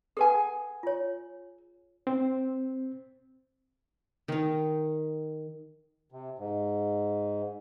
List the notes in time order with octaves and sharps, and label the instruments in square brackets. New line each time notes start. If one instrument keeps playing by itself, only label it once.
[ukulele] G#4 G#5 [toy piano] A4 B4 F#5
[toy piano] F4 C#5
[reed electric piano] C4
[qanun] D#3 D#4
[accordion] C3
G#2